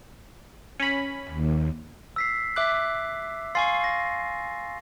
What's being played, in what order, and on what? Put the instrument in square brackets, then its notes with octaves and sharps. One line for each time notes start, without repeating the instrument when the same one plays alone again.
[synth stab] C#4 B5
[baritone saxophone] D#2
[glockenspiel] E6 B6 C7
[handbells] E5 D6 F#6
[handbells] F5 G#5 C#6 [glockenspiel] C6 A6 C7
[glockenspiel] A#6